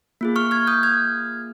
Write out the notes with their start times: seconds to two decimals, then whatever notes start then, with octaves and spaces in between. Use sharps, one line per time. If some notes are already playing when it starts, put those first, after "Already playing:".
0.21 A#3 F4 G#4
0.36 C#6 F6
0.51 F6 G#6
0.67 D#6 G6
0.83 F6 G#6